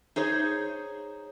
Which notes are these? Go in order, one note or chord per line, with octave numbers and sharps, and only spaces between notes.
D#4 G#4 C5 C#5